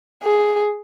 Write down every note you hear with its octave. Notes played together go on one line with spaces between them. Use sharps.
G#4